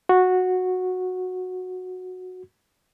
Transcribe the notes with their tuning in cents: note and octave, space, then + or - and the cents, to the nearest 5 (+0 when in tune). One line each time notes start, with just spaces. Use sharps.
F#4 -10